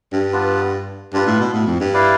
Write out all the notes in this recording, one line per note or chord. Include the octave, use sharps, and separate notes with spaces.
G2
B3 D4 F4 B4
G2 D4 F4 B4
A2
B2
A2
F2
G2
E4 B4 D5 F5